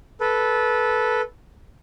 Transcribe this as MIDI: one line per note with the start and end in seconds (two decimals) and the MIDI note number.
0.20 1.21 69
0.20 1.21 71